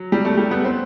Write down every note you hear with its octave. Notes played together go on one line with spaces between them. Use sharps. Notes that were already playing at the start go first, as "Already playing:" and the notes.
Already playing: F#3
G3
A3
G3
B3
C4